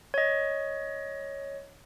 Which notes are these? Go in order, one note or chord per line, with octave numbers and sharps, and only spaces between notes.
C#5 D#5